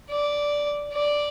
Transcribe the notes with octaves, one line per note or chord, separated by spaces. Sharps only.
D5
D5